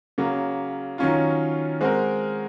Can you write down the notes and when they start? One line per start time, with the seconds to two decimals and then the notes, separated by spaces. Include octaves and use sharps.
0.18 C#3 F#3 A#3
0.98 D#3 F#3 C#4 F4
1.81 G#3 C4 F#4 A#4